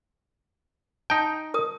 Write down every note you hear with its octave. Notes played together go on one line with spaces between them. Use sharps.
D#4 G5 A5
A#4 D#6